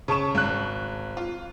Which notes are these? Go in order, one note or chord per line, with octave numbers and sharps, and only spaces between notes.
C#3 A5 C#6 E7
G#1 F#6
F4